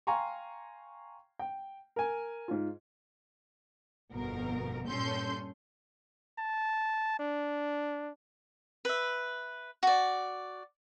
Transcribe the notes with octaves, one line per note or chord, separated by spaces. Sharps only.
F5 G5 G#5 A#5 C6 C#6
G5
A#4 G#5
G#2 F4
G1 F2 B2 A#4
G2 A#2 C#4 A4 C6 G6
A5
D4
B4 E5
F#4 D5